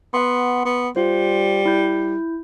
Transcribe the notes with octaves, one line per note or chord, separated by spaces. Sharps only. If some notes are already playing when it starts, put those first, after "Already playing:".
B3 F#5 C6
B3
G3 F4 C5
E4 G6